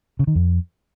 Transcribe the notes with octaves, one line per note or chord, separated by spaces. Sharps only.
C#3
D#3
F2